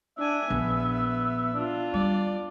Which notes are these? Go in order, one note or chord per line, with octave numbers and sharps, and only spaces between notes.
D4 E5 G#5
A#1 B3
D4 F4
G3 D5